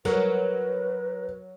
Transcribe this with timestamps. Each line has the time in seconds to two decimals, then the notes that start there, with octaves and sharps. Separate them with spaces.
0.05 F#3 A#4 B4